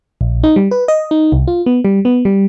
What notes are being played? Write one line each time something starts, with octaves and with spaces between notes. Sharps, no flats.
A#1
D#4
G3
B4
D#5
D#4
C2
F4
B3
G3
B3
G3